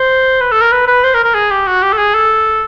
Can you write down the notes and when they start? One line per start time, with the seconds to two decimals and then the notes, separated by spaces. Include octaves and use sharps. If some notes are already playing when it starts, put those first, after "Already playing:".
Already playing: C5
0.41 B4
0.52 A4
0.61 A#4
0.72 B4
0.87 B4
1.04 C5
1.14 A#4
1.24 A#4
1.35 G#4
1.51 G4
1.67 F#4
1.83 G4
1.93 A4
1.98 G#4
2.14 A4